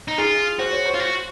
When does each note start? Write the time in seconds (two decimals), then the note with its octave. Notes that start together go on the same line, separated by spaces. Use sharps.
0.08 D#4
0.18 F4 G#4
0.59 F#4 C5
0.73 C#5
0.86 C5
0.94 F4
1.00 F#4